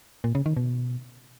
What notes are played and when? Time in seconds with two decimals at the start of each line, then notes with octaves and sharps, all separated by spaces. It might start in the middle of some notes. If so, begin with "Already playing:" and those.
0.24 A#2
0.35 C#3
0.46 D#3
0.57 B2